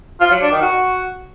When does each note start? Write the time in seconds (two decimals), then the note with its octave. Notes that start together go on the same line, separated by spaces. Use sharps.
0.21 F4
0.31 F#3
0.41 D4
0.52 D#3
0.62 F#4